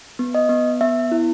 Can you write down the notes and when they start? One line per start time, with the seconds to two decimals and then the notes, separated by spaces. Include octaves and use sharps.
0.19 B3
0.34 D#5
0.49 B3
0.81 B3 E5
1.12 E4